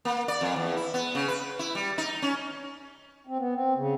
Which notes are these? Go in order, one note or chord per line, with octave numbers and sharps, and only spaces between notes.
A#3
D5
F2
E2
E4
B3
C#3
B4
E4
G3
D#4
C#4
C4
B3
C4
C#3